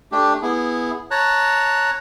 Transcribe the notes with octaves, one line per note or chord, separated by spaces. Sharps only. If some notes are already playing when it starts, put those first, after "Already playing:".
A3 D4 G4
B3 E4 G#4
C#5 A5 A#5 F#6